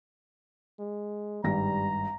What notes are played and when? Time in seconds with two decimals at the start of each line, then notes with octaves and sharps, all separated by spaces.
0.79 G#3
1.44 G#1 G2 G3 A#5 A#6